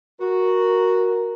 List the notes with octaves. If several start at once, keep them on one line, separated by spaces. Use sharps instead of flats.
F#4 A#4